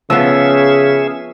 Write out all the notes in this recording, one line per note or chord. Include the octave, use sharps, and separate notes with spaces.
C#3 F3 B3 C#4 G#4 E5 E6